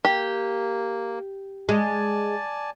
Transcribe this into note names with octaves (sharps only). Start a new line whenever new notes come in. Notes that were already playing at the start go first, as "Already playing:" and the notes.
A#3 G4
G#3 D5 G#5 A5